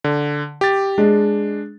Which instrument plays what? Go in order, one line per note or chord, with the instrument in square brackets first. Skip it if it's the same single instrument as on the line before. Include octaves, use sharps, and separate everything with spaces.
[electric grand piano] D3
G4 A6
[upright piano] G#3 [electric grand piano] D4